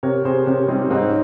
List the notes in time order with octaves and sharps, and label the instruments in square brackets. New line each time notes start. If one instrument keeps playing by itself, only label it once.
[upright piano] C3 [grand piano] A#4 C#5
[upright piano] C3 [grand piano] G#4 C5
[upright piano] C3 [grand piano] C#4
[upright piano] G3 [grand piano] C4 D#4
[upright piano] G#2 [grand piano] C4 D#4
[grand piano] C#4